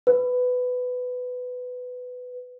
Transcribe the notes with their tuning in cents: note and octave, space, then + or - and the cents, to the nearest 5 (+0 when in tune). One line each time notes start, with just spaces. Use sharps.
B4 +15